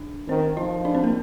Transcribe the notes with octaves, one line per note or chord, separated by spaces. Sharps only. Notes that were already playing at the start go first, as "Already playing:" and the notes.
Already playing: D4
D#3 C4 C5
F3 D#4 D#5
D4 D5
C4 C5
A#3 A#4